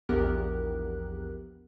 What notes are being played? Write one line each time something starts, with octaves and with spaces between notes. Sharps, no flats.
A#1 E2 B3 G4 A#4 F#6